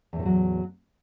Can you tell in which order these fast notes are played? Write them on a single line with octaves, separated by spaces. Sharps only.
E2 A2 D#3 F3 F#3